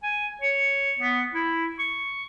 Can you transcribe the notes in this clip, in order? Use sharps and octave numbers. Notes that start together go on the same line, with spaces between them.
G#5
C#5
B3
E4
C#6